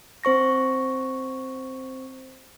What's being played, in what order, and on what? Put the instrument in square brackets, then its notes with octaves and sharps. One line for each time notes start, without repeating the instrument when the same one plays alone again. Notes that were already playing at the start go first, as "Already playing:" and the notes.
[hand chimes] C4 C5 C#6 A#6